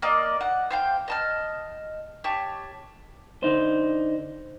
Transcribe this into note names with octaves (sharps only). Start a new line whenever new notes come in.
A#3 D5 D#5
F#5
C5 F5 G5
D#5 A5 F6
G4 C#5 A5
D3 D#4 C5